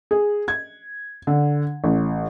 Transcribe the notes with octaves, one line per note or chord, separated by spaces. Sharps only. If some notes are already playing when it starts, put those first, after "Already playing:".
G#4
G#6
D3
A1